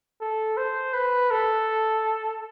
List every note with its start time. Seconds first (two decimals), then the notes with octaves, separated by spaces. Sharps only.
0.21 A4
0.57 C5
0.94 B4
1.31 A4